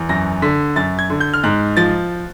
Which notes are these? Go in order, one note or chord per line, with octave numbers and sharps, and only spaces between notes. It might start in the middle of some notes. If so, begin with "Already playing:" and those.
Already playing: E2
F#2 A#6
D3 B6
F#2 A6
G#6
D3
G6
F6
G#2 F#6
F3 A6